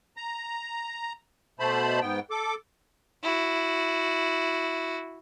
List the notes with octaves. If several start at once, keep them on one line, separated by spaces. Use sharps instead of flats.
A#5
B2 A3 C5 A5 B5
G#2 B3 G5
A4 D6
E4 F#4